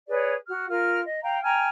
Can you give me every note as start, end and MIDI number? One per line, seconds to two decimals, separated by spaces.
0.09 0.32 68
0.09 0.32 71
0.09 0.32 73
0.09 0.32 74
0.46 0.66 66
0.46 0.66 89
0.68 1.00 65
0.68 1.00 70
0.68 1.00 89
1.05 1.18 75
1.23 1.39 77
1.23 1.39 79
1.23 1.39 82
1.42 1.69 79
1.42 1.69 80
1.42 1.69 82
1.42 1.69 89